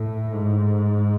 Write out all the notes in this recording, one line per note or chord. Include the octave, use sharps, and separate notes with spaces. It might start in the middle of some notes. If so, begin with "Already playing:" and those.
Already playing: A2
G#2